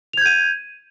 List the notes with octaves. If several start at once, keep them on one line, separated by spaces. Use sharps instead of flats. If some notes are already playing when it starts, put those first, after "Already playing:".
G6 G#6 D#7 F7